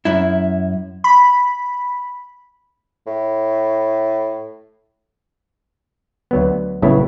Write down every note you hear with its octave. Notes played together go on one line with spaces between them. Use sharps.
F#2 E4
B5
A2
D2 F#3 B3
A#1 A2 C#3 F#3 B3 E4